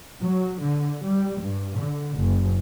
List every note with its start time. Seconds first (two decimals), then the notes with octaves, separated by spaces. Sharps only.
0.21 F#3
0.60 D3
1.04 G3
1.39 G2
1.78 D3
2.17 F#1